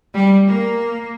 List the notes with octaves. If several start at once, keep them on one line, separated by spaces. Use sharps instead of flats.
G3
A#3